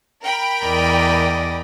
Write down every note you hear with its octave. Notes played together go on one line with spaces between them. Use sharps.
A#4 G5 B5
E2 D5 D#5